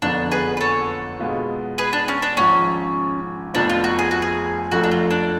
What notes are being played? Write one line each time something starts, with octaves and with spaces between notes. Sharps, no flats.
F#1 F2 D3 F3 B3 D4
G#4 B4
B4
A4 C#5
B2 G#3 B3 F4
G#4 B4
D4
C#4
D4
G#1 G#2 F3 C#4
F1 F2 F3 B3 D4
F4
F#4
G#4
F#4
G#4
F#1 F2 F3 A3 F#4
D4
F4
D4